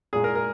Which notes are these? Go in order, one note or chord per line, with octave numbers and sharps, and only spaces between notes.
A#2 G#3 G#4
A#4
A#4